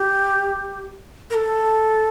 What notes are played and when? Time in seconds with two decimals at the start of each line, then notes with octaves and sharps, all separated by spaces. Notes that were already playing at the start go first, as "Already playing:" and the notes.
Already playing: G4
1.30 A#4
1.35 A4